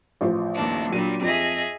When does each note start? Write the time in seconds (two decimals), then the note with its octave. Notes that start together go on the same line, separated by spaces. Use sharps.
0.21 A1 F3 C5
0.55 D#2 D4
0.92 A#2 F#3 G3 D4 D#7
1.22 F2 G#4 D#5 E5